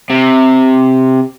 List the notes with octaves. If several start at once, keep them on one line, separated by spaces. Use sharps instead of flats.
C3